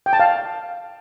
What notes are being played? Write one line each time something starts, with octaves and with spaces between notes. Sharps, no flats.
G5
A5
F5